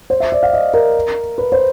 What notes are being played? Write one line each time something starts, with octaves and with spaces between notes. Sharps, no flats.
C5
E5
D5
F5
D#5
A#4
B4
C5